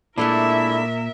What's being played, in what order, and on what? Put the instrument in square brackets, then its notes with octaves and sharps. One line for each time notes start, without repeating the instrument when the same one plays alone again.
[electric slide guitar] A#2 [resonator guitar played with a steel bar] G#3 A3 D4 [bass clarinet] E4 [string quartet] A#4 E5